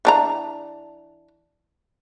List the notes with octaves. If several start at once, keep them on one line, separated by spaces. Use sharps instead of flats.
E3 D4 A#5